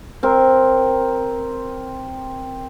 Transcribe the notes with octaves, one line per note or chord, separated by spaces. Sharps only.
C4 A#4